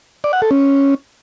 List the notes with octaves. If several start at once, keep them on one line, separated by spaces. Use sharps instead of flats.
D5
F#5
A4
C#4